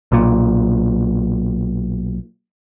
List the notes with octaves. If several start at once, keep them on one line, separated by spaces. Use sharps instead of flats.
B1 A#2